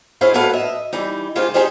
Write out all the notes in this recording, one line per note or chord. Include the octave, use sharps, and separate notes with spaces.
E4 G#4 C5 C#5 D#5 F5
A2 F#3 A4 B4 F5 F#5
D#5 E5
E3 G3 D#4
C#3 G#3 F4 G4 C5 F5
D#4 G4 G#4 C5 D#5